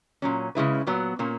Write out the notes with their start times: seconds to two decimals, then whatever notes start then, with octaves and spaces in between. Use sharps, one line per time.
0.22 A#2 F#3 C#4
0.55 C#3 G#3 C#4 E4 B4
0.87 A#2 F#3 B3
1.19 A#2 A#3 C#4